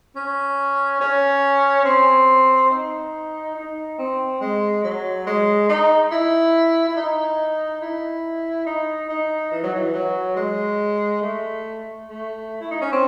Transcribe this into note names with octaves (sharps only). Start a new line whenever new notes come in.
C#4
C#4
C4
D#4
D#4
C4
G#3
F#3
G#3
D#4
E4
E4
D#4
E4
D#4
D#4
E3
F#3
E3
F#3
G#3
A3
A3
E4
D#4
C#4
C4